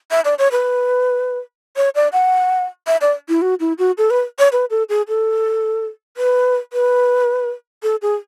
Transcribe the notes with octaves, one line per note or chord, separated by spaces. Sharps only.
E5
D5
C#5
B4
C#5
D5
F#5
E5
D5
E4
F#4
E4
F#4
A4
B4
C#5
B4
A4
G#4
A4
B4
B4
A4
G#4